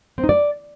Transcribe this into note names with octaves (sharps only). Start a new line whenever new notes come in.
C4
D#4
D5